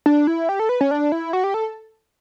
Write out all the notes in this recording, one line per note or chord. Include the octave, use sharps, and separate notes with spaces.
D4
E4
G4
A4
B4
C#4
D4
E4
F#4
G4
A4